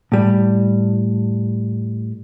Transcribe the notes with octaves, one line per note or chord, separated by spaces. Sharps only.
A2 G3